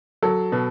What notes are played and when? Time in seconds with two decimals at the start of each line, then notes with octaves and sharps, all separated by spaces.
0.23 F#3 A4
0.52 B2